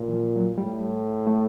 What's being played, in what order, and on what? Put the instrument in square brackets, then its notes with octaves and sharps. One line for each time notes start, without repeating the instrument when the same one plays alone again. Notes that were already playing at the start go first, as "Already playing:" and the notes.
Already playing: [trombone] A#2
[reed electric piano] E3
F3
F#3
[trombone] A2 [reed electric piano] G3
[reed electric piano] A3